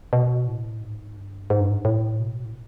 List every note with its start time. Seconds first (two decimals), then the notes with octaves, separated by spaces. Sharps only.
0.13 B2
0.48 A2
0.82 G#2
1.17 G2
1.50 G#2
1.60 G2
1.70 G#2
1.85 A2
2.20 B2
2.45 A2